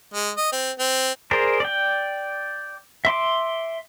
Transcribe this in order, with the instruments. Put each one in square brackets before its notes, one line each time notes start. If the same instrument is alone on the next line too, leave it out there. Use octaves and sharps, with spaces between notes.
[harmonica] G#3
D#5
C4
C4
[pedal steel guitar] G#4 A#4 C5 D5
D5 G5
E5 C6 D6